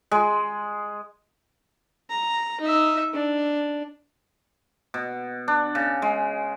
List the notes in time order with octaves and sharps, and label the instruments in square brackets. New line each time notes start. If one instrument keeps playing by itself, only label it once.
[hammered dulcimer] G#3
[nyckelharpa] A#5
D#4 E5
D4
[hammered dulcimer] B2
D4
C#3
G#3